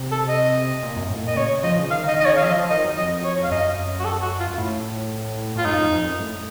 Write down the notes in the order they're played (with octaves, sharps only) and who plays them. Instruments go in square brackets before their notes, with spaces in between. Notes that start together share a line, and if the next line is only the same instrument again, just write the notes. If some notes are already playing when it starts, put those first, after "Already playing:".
Already playing: [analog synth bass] C3
[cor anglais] A4
D#5
[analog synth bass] A#2
F#2
A2
[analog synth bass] A#2 [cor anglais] D#5
[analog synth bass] C#3 [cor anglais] C#5
[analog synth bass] F3 [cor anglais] D#5
[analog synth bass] C#3
[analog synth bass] D#3 [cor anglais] F5
[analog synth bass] D#3 [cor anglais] D#5
[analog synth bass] D#3 [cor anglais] D#5
[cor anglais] C#5
[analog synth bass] C#3
[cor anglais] F5
[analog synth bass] F3 [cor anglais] D#5
[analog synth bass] F3
[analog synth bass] D#3 [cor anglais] D#5
[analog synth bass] F#2
[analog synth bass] F2 [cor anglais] D#5
[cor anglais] C#5
F5
[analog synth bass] F#2 [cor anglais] D#5
[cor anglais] F#4
A4
F#4
F4
[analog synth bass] A2
[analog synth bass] A2 [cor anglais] F4
[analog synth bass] F#2 [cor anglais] D#4
[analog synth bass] F2
F2
F#2
A2